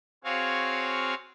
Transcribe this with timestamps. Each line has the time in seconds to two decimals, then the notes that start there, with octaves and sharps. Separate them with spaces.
0.24 C4 F#4 G#4 C#5 F5